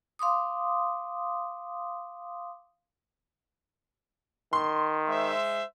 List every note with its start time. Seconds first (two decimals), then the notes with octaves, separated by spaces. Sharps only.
0.19 F5 C6 D6 D#6
4.53 D#3 C6
5.09 G#3 C5 E5